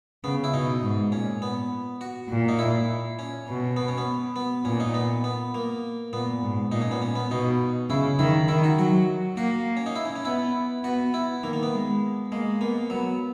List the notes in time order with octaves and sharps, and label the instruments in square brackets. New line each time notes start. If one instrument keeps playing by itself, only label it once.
[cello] C#3 [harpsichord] B3
[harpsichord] E4
[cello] B2 [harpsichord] D#4
[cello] G#2
[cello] A#2 [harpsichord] C#4
[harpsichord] B3
F#4
[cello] A#2
[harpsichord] D#4
E4
C#4
[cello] B2
[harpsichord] B3
C#4
B3
B3
[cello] A#2 [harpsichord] C#4
[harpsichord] D#4
B3
B3
A#3
[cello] A#2 [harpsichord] B3
[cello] G#2
[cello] A#2 [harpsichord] D#4
[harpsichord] C#4
B3
C#4
B3
[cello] B2 [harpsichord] D#4
[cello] C#3 [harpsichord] E4
[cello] D#3 [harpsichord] E4
[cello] D#3 [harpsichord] E4
[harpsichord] F#4
[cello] F#3 [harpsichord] F#4
[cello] A#3 [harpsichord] F#4
[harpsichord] C#4
D#4
E4
C#4
C#4
[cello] B3 [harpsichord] E4
[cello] B3 [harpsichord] F#4
[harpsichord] E4
[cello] D#3 [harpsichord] A#3
[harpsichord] A#3
B3
[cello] G#3
[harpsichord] G#3 [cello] A#3
[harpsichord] A#3 [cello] B3
[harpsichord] F#3 [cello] B3